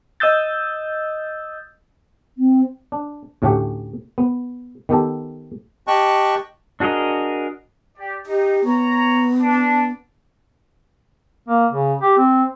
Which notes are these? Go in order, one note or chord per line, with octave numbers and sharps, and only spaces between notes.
D#5 D#6 E6 G6 A6
C4
D4
D2 A2 A3 C#4 G4 F#5
B3
D#3 B3 G4 A4
G4 D#5 G5 A5 C#6 F#6
D4 F#4 G#4 A#4 D#5
G4 D5
D#4 G4 D#5
B3 C#5 A#5
D4
A#3
C#3
G4
C4